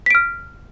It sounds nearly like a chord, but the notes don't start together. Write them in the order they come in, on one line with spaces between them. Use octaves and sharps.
B6 D7 F6